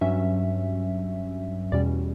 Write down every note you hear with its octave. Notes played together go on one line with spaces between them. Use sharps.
G2 F#3 C#4 E5
E2 B2 G3 C#4 D5